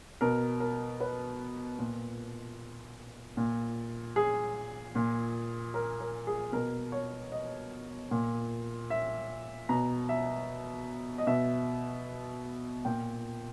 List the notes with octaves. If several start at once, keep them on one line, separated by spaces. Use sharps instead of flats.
B2 A#4
A#4
B4
A#2
A#2
G#4
A#2
A#4
A#4
G#4
B2 A#4
C#5
D#5
A#2
E5
B2 A#5
E5
D#5
B2 E5
A#2 G5